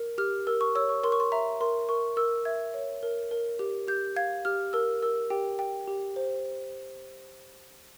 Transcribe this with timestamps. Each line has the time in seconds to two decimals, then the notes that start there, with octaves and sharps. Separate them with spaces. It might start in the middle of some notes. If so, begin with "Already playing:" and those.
Already playing: A#4
0.18 G4 F6
0.47 A#4 E6
0.61 C#6
0.75 C#5 E6
0.89 C#6
1.04 A#4 C6
1.12 C#6
1.20 C6
1.32 E5 A#5
1.61 A#4 C6
1.89 A#4 C#6
2.17 A#4 E6
2.45 E5 G#6
2.74 C#5
3.03 A#4
3.31 A#4
3.59 G4
3.88 G4 G6
4.16 F5 G#6
4.45 G4 F6
4.73 A#4 E6
5.02 A#4 E6
5.30 G4 G5
5.59 G5
5.88 G4
6.16 C5